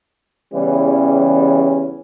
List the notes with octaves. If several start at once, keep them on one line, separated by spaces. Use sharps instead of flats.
E2 C#3 E3 G3 C#4